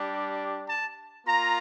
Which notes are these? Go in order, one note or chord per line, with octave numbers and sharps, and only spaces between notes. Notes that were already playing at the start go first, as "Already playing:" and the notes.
Already playing: G3 D4 G4
A5
A#3 F4 A#5